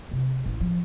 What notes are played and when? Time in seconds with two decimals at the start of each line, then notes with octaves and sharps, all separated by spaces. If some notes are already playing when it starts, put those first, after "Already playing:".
0.11 C3
0.46 A1
0.60 F3